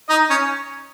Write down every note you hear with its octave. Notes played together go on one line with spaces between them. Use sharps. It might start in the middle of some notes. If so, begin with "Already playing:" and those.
D#4 D#5
C#4 C#5